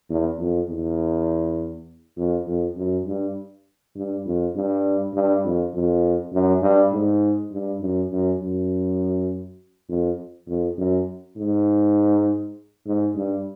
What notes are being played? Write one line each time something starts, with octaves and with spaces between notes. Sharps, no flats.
E2
F2
E2
F2
F2
F#2
G2
G2
F2
G2
G2
F2
F2
F#2
G2
G#2
G2
F#2
F#2
F#2
F2
F2
F#2
G#2
G#2
G2